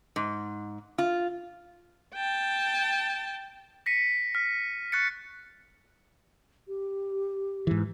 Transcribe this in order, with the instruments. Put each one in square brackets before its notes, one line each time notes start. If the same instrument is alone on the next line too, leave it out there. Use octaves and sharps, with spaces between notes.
[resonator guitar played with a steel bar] G#2
F4
[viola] G5 A5
[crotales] A#6 B6 C#7 D#7
F6 B6
C#6 F#6 A6 C#7
[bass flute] G4
[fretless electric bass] G#2 E3